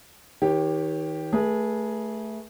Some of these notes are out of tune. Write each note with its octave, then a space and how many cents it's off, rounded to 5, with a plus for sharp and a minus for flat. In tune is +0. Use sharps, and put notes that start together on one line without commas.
D#3 +35 G4 +0 C#5 -15
A3 +0 G#4 +0 B4 -35